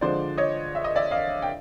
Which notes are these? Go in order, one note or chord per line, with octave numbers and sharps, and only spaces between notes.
D3 F3 G#3 C5 D5
C#5 D#5
E5
D#5
D5 E5
D#5 F5
G5